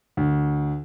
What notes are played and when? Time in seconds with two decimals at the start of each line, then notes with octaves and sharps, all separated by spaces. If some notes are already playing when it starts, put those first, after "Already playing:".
0.17 D2